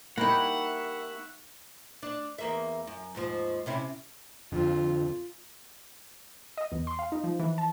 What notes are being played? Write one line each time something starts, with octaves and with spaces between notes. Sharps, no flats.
A#3 D#4 E4 G4 E5 F#5 C#6
D4
E2 A#3 E5
F#2
D#2 G#2 F3
C3 C#4 E4
F2 D3 F4
D#5
E2
C6
F5
D#4
F3
E3
A5